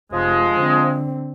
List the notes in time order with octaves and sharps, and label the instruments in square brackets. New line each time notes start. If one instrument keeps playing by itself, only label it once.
[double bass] F1 [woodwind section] F3 G#3
[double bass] D3 C4